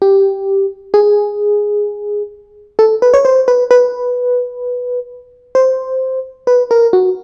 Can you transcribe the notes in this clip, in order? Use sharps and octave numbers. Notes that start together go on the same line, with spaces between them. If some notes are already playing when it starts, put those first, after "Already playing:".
G4
G#4
A4
B4
C#5
C5
B4
B4
C5
B4
A#4
F#4